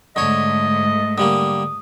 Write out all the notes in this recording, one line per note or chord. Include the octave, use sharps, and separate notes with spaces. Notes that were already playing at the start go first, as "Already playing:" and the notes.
G#2 D3 A3 C#5 D#5
D3 G3 A#3 D#6